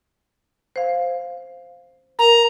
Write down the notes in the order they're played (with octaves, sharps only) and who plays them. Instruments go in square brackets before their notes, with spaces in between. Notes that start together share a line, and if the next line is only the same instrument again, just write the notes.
[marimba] C5 F5
[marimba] A#4 [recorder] A#5